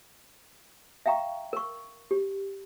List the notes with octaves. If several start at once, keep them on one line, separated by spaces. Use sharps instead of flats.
E5 F5 G5 A#5 C#6
A#4 C#6
G4